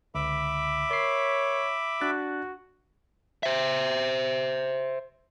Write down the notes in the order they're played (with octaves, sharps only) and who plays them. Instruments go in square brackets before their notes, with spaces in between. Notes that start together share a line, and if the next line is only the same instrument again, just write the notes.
[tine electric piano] C#2 D3 [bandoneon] E5 B5 D6
[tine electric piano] A#4 C7 [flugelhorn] C#5
[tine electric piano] D4 F#6 A6 [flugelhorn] F#4
[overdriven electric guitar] C5 E5